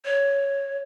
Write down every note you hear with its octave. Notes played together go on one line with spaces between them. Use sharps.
C#5